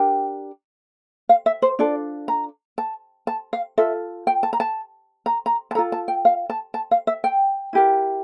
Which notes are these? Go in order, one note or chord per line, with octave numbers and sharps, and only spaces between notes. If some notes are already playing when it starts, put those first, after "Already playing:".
Already playing: D4 G4 A#4 G5
F5
E5
C5
D4 F4 A4 D5
A#5
A5
A5
F5
F4 A4 E5
G5
A5
A#5
A5
A#5
A#5
A5
F4 A4 A#5
A5
G5
F5
A5
A5
F5
E5
G5
E4 G4 A#4